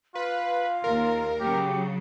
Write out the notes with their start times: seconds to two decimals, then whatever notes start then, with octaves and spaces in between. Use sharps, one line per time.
0.15 F4 B4 F5
0.84 D#2 A#4
1.40 C#3 F#3 G4